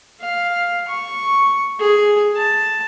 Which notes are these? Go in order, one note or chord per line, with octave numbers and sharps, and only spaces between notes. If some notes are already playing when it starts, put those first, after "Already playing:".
F5
C#6
G#4
A5